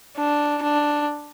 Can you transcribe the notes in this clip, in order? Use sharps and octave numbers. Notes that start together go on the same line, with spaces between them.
D4
D4